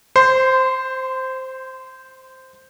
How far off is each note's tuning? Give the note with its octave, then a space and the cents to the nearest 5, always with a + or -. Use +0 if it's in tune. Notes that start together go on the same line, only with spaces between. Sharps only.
C5 +0 C6 -25